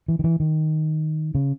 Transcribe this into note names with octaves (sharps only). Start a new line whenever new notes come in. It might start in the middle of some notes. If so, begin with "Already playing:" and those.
E3
D#3
E3
D#3
C#3